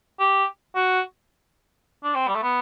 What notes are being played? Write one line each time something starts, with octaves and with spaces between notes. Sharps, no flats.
G4
F#4
D4
C4
G3
A3
B3